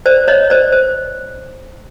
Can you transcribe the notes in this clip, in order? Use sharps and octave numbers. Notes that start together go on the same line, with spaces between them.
C5 D5
C#5 D#5
C5 D5
C5